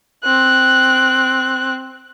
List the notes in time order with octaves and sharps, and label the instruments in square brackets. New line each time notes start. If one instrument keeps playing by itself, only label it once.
[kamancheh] C4 F#6